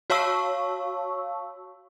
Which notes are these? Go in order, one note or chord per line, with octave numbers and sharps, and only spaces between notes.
F#4 C#5 F5 A5 C#6 E6